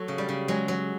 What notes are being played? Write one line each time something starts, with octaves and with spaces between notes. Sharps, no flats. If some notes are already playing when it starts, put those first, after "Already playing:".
Already playing: F#3 A3
C#3
G3
C#3
F#3 G#3
F#3